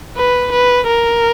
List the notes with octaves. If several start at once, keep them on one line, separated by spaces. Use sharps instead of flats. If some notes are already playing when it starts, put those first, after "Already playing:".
B4
B4
A#4